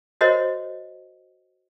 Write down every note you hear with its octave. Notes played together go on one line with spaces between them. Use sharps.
F#4 A#4 C5 C#5 D#5